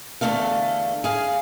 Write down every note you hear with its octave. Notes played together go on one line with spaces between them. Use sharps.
E2 D3 A3 A4 F5
G#4 F5